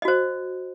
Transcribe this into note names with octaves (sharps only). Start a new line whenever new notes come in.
F#4 C5 D#5